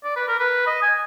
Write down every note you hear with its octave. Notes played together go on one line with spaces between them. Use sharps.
D5
B4
A#4
B4
D#5
G#5